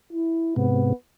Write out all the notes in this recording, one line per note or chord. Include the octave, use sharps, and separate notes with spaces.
E4
G#2 C3 B3